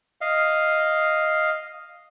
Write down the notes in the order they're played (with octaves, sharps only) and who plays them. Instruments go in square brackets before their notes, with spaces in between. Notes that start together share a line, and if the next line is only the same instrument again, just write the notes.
[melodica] D#5 F5